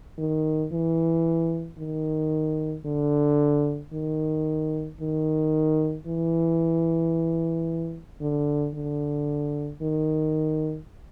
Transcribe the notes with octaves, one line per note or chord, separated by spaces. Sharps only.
D#3
E3
D#3
D3
D#3
D#3
E3
D3
D3
D#3